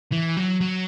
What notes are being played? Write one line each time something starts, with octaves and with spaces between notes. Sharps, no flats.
E3
F#3
F#3